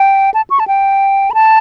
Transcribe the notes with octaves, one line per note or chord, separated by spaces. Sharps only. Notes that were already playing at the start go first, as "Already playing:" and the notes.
Already playing: G5
A5
C#6
A5
G5
B5
A5